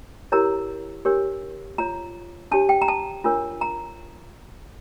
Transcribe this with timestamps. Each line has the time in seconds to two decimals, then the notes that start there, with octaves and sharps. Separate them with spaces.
0.32 E4 G4 A#4 C#5 A#5
1.05 D4 G4 A#4 C#5
1.78 F4 C#5 A#5
2.51 D4 G4 C#5 A5
2.69 G5
2.82 A#5
2.88 A5
3.24 D4 F4 A#4 C#5
3.61 A#5